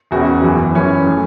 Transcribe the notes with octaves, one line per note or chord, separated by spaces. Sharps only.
E1 E2 C#3 F#4
F#1 E2 E3
F#1 F#2 E3 C#4
E3 A3